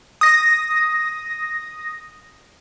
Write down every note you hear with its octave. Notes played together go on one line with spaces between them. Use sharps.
D#6 A#6